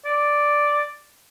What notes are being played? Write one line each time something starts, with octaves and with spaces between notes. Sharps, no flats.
D5